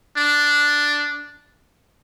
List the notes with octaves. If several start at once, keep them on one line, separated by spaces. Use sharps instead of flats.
D4